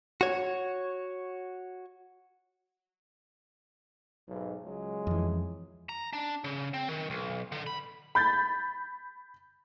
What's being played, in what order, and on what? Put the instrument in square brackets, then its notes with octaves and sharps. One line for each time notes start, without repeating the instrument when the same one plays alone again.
[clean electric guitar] F#4 C#5
[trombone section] B1 G#2
C#2 F#3 G#3
[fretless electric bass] F2 E3
[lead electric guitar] A#5
D4
C#3
C4
D#3
B1
D3
B5
[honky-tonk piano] B5 G6 A6